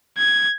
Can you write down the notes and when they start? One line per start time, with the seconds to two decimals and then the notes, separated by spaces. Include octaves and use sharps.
0.18 G#6